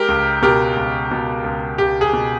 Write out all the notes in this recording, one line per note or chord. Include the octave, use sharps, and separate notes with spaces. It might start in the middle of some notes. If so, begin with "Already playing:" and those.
Already playing: G#3 G4 A#4
C#2
B2 G4 A#4
C#2
B2
C#2
C#2 G4
G#4
B2